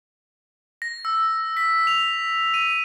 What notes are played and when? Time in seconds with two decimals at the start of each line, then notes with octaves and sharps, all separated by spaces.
0.82 A#6
1.05 E6
1.57 B6
1.87 F7
2.54 D#7